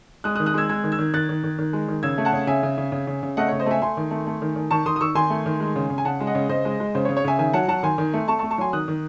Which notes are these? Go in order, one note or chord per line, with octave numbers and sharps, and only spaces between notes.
G#3 D#6 F#6
D#6 F#6
D#3
D#6 F#6
G#3 E6 G#6
G#3 E6 G#6
D#3
E6 G#6
D#3
D#3 F#6 A6
D#3
D#3
D#3
G#3
D#3
C#3 E6 G#6
A3
F#5 A5
C#3
C#3 E5 G#5
C#3
C#3
C#3
C#3
C#3
A3 D#5 F#5
C#3 C#5
C5 D#5
A3 E5 G#5
A3 G#5 C6
D#3
A3
A3
D#3
D#3
D#3 A5 C#6
D#3 C6 D#6
D#6
D#3 C#6 E6
D#3 G#5 C6
A3
D#3
G#3
C#3
C#3
G#5
C#3 F#5 A5
G#3
D#5 F#5
C#3
C#3 C5 D#5
G#3
G#3
C#3 C5
C#5
C#3
C#5
C#3 E5 G#5
D#3 E5 G#5
F#3 F#5 A5
F#3 F#5 A5
D#3 G#5 C6
D#3
A3
A3 A5 C#6
A5 C#6
A3
A5 C#6
F#3 G#5 C6
D#3 D#6 F#6
D#3